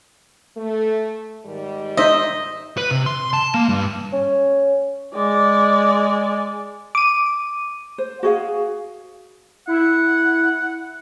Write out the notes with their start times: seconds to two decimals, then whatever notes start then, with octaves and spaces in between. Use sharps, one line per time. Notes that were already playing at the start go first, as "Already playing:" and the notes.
0.57 A3
1.45 G#2 D#3 G3
1.97 D#4 C5 D#5 E5
2.78 B4
2.91 C3
3.06 C6
3.33 A5
3.54 A#3
3.69 G2
4.12 C#4
5.14 G#3 D5
6.95 D6 D#7
7.98 C5
8.23 F#4 G#4 F5
9.67 E4 F#5